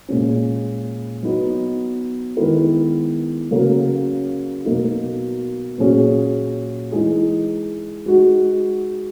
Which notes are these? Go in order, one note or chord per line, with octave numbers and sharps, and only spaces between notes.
A#2 G#3 C#4
F#3 B3 D#4
D#3 G#3 B3 E4 A#4
C#3 F#3 A#3 C#4
B2 F#3 A#3 D#4
A#2 F#3 C#4 G#4
E3 G#3 D#4 G#4
G#3 D#4 F#4